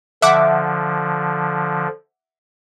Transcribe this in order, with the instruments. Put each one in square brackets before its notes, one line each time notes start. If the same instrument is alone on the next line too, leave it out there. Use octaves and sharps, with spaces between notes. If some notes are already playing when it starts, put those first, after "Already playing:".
[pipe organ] D3 F3 [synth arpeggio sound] E5 F#5 D6